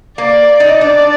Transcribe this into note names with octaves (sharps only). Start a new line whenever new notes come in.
A#3 D5
D#4
D4 D5